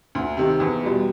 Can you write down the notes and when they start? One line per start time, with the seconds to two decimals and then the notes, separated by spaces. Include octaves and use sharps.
0.15 D2
0.37 C3 D#3
0.60 E2
0.83 B2 G3